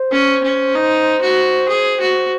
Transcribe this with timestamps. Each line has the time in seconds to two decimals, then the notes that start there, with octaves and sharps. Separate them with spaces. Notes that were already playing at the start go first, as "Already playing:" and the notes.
Already playing: C5
0.11 C#4
0.43 C#4
0.75 D#4
1.21 F#4
1.68 G#4
2.00 F#4